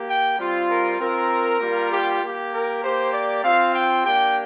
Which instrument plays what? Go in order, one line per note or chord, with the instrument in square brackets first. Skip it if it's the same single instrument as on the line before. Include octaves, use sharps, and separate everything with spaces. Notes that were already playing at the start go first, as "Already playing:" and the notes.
Already playing: [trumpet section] A#3 G4
G5
G3 C4 F4
A#4
C4 F4 A#4
G3 A#3 F4
G4
A#3 G4
A#4
A#3 G4 C5
D5
C4 F4 F5
G5
A#3 D4 G4 G5